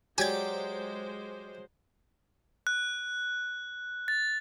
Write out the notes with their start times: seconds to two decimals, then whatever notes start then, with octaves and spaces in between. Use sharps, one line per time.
0.18 F#3 G#3 G4 C5 D5 G#5 G#6
2.67 F#6
4.08 A6